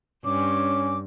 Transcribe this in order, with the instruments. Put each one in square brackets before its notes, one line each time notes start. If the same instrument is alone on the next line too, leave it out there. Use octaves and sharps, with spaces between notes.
[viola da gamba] G2 [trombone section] C#4 [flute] D6